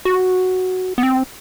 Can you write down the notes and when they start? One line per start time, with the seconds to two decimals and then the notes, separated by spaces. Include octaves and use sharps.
0.05 F#4
0.98 B3
1.03 C4